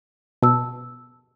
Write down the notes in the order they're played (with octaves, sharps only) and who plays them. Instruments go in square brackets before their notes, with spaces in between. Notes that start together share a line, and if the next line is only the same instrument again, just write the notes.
[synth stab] B2 [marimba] A5 E6